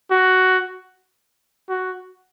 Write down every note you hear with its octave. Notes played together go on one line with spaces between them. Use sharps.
F#4
F#4